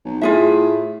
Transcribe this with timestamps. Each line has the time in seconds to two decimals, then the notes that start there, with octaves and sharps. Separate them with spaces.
0.05 B1
0.21 A2 F4 G#4 E5